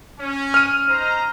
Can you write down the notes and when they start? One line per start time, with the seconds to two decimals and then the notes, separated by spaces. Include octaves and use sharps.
0.19 C#4
0.54 F6 D#7
0.88 D#4 C5 A#5